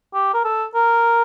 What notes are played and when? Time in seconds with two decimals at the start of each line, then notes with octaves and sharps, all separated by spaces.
0.14 G4
0.34 A#4
0.44 A4
0.75 A#4